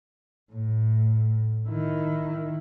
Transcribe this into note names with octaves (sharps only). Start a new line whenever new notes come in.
A2
D#3 E4